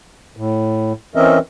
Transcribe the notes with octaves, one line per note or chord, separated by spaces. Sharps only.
A2
E3 C4 C#4 A#4 D#5 E5